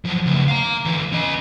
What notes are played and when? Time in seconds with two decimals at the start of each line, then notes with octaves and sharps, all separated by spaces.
0.05 F3 F#3
0.26 C#3 A3
0.48 F5 A#5
0.85 D3 E3
1.12 C#4 D#5